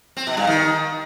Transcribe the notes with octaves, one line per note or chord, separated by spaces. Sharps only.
C4
B2
G2
D#3